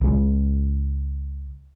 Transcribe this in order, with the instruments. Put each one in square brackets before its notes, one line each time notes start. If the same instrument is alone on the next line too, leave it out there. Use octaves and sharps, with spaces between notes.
[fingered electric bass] C#2 C#3 G#3